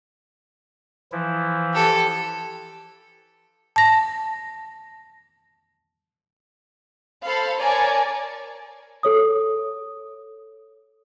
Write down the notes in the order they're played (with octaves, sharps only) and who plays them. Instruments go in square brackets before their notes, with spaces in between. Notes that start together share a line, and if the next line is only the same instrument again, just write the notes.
[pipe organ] E3 F3 E4
[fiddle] G4 A4
[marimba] A5 A#6
[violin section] A4 C5 F5 B5
A#4 C#5 D5 G#5 A5
[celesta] A4 C#5 D#6